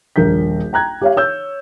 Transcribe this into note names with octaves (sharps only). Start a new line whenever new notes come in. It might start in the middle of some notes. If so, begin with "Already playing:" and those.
D#1 A#1 A#4 G6 B6
G5 A#5 F#6 G#6
G4 C#5 F5
C#5 E6 G6